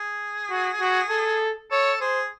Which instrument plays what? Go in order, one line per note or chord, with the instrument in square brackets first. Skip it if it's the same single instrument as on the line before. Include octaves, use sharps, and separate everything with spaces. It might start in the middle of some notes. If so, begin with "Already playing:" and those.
Already playing: [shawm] G#4
[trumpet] F#4
F#4
A4
[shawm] A4 [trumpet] C#5
[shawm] G#4 [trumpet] C5